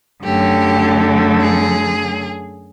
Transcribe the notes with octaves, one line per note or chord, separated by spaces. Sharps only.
F#2 D3 F#3 A3 G4
G#4